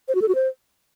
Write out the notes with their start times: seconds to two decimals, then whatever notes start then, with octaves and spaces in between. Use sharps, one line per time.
0.08 C5
0.15 F#4
0.22 A4
0.28 F#4
0.35 C5